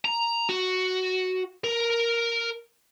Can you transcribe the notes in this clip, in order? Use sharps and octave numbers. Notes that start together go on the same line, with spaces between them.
A#5
F#4
A#4